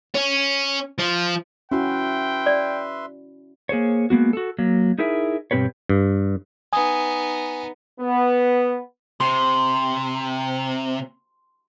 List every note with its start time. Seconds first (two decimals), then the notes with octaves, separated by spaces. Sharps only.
0.15 C#4
0.99 F3
1.71 C#4 E4 F#4 B4 E5 G5 C6
2.46 D5
3.69 A#3 G#4 C5 C#5
4.10 G#3 A#3 B3 F#4
4.33 F#4 A4
4.59 F#3 A#3
4.98 D#4 E4 G#4 A#4 E5
5.51 G2 B2 C4 G4 B4 C#5
5.89 G2
6.73 B3 D#4 G#5 D#6
8.00 B3
9.20 C3 C6